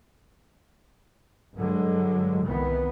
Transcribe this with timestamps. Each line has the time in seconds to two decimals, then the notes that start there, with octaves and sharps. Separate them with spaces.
1.57 G2 D3 F#3 G#3
2.44 C2 D#3 E3 B3